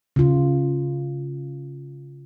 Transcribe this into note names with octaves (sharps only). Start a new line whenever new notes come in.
C#3 F4